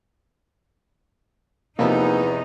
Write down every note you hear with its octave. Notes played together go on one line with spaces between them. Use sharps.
E2 C3 F3 A#3 B3 D#4 B4 D#5